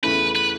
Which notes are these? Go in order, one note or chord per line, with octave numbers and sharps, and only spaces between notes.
E2 C#3 E3 A3 C#4 B4
B4